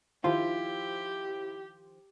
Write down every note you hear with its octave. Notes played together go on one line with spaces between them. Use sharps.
D#3 F3 E4 F4 G4 C5